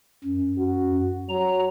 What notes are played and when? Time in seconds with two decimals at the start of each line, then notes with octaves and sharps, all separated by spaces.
0.25 F#2
0.58 F#4
1.29 F#3 A#5